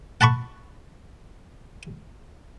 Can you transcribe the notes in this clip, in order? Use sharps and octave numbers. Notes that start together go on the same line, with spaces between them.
F#5 A5 B5 C#6